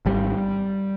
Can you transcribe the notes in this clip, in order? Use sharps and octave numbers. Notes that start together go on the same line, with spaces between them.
G#1 G3